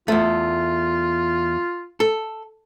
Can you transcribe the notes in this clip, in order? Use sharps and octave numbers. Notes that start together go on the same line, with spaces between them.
E2 A3 F4
A4